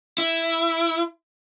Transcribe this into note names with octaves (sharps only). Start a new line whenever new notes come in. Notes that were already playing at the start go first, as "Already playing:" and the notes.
E4